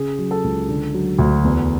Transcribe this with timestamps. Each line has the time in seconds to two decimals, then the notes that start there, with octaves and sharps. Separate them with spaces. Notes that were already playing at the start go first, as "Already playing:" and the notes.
Already playing: C#3 G#4
0.19 F#3
0.31 A4
0.44 C#2
0.69 D3
0.94 F#3
1.19 D2
1.44 E2